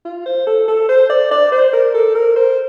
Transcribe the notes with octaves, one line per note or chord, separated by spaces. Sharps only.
F4
C5
A4
A4
C5
D5
D5
C5
A#4
A4
A#4
C5